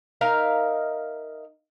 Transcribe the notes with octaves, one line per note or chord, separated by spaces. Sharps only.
D#4 A#4 E5 F5